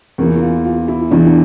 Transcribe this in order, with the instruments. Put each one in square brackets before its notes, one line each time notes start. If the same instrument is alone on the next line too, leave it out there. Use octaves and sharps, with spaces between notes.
[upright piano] E2 E3 A#3
F4
F4
E4
E2 E3 D4